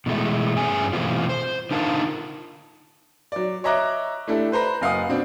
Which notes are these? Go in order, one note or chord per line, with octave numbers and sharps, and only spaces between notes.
B2 E3 G#3 A3
G2 A3 C#4 G#4 G#5
B2 E3 G3 A3 C4 F4
C5
D3 D#4 F4 A#4 F5 A5
F#3 D5
C#5 D#5 E5 A#5 D6 F#6
A3 D4 E4 G4 A4
B4 C5 A#5 B5
F#1 F5 F#5 D#6
B2 C4 D4